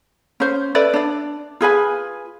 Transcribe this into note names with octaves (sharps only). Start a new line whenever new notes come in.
C#4 C5
A4 B4 D5 E5
D4 D5
F4 G#4 B4 G#5